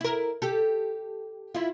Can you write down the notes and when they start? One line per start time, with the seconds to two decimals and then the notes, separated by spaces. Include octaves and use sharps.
0.01 E4 A#4
0.42 G4 A4
1.55 E4 F4